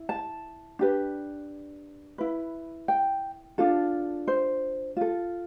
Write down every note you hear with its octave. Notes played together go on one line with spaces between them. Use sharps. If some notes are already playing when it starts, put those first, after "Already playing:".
Already playing: E4
A5
D4 G4 B4
E4 B4
G5
D4 F4 A4
C5
F4 A4